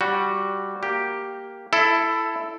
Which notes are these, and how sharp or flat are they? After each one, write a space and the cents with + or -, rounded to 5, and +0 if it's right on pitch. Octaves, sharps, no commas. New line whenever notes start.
G3 +0 F#4 +0
A#3 +0 G4 +0
E4 +15 A4 +0